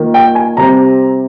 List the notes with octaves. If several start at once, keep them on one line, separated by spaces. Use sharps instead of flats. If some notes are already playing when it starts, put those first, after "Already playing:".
Already playing: D#3 A#3 F4
G5
G#5
C3 G3 C4 A#5